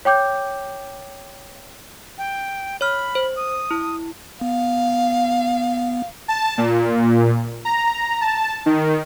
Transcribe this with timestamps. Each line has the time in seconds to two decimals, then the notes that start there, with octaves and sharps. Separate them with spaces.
0.05 C#5 G5 D6 G6
2.18 G5
2.81 C#5 B5 F6
3.15 C5
3.36 D#6
3.71 E4
4.41 B3 F5
6.28 A5
6.58 A#2
7.65 A#5
8.21 A5
8.66 D#3